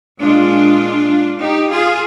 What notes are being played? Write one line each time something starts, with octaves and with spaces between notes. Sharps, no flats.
A#2 G#3 D4 F4
D#4 G4
F4 G#4